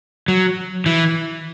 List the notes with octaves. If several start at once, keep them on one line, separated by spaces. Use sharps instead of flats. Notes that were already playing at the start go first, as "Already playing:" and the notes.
F#3
E3